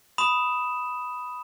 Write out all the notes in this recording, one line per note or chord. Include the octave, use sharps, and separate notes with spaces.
B5 D#6 E7